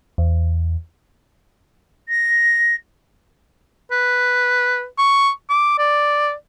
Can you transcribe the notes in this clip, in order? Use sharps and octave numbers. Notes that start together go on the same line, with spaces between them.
E2
A#6
B4
C#6
D6
D5